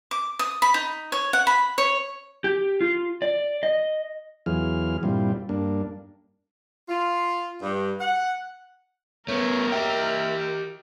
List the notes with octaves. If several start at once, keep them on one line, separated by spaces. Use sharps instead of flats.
D6
D#6
B5
D#4
C#5
F#5
B5
C#5
G4
F4
D5
D#5
E2 E3 F#3 F4 G#4 F6
G2 A#2 G3 C4 E4 F4
G2 A#3 D4
F4
G2
F#5
A3 B3 A#4 C#5
G4 D#5 E5 G5